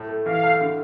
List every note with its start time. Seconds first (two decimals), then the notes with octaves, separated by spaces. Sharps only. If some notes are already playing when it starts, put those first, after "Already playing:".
Already playing: A2
0.09 A3
0.25 E3 F5
0.43 A2
0.61 D3